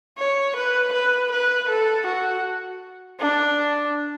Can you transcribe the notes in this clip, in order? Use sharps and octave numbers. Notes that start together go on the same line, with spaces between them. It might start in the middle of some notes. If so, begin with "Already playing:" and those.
C#5
B4
B4
B4
A4
F#4
D4